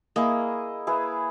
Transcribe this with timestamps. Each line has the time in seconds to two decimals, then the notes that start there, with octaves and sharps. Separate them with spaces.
0.16 A#3 E4 G#4 D#5
0.87 E4 G#4 B4